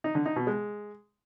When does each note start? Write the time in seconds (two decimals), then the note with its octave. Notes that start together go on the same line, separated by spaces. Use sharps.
0.04 D#4
0.15 D3
0.26 D#4
0.36 B2
0.47 G#3